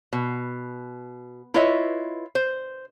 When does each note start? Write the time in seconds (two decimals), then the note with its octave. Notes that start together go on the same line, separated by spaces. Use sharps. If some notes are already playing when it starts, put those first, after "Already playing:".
0.13 B2
1.54 E4 F4 B4 C#5 D#5 E5
2.35 C5